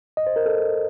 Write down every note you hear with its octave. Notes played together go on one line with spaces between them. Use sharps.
D#5
C5
A#4
A4